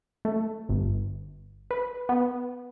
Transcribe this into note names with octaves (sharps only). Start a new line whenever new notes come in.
A3
G1
B4
B3